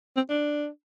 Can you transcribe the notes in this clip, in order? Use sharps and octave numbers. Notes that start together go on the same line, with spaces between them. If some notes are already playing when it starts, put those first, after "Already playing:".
C4
D4